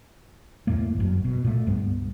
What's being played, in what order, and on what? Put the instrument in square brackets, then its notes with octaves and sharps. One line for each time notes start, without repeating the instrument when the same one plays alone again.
[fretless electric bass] E2 A2 A3 A#3
G1 F#2
B2
A#2 A3
C#2 G2 G3 B3